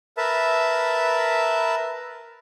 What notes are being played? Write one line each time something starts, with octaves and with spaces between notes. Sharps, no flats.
A#4 B4 E5 A5